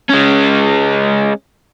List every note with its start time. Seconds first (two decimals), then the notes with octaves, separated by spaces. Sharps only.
0.10 G#3 C#4